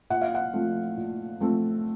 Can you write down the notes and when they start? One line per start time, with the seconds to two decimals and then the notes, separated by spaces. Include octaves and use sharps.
0.10 A#2 F#5
0.22 F5
0.35 F#5
0.53 F3 A3 C4
0.97 A#2
1.40 F3 A3 C4